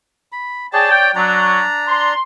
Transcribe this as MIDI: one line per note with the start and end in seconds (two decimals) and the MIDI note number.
0.32 0.67 83
0.73 0.87 68
0.73 1.11 73
0.73 1.11 74
0.73 0.87 79
0.73 0.87 81
0.89 1.09 79
1.15 1.59 54
1.15 2.14 62
1.15 2.14 74
1.15 2.14 82
1.87 2.18 84